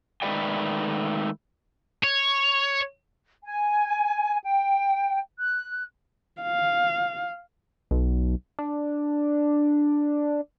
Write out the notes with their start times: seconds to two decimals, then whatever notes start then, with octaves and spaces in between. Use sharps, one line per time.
0.22 D#3 G#3 A3 B4 D5 G5
2.03 C#5
3.45 G#5
4.43 G5
5.40 F#6
6.42 F5
7.91 B1
8.59 D4